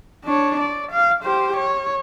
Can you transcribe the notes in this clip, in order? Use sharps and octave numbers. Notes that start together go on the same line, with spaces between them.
D4 C#5
D5
F5
G4 C5
C#5